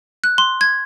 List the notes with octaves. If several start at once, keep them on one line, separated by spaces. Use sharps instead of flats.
F#6
C6
G#6